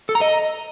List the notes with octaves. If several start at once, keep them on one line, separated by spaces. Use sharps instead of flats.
A4
A#5
D#5